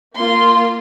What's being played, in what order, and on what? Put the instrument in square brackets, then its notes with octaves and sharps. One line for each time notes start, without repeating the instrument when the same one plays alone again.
[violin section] A#3 F4 C6